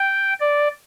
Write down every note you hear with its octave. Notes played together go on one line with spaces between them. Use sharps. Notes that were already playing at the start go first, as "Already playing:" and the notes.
Already playing: G5
D5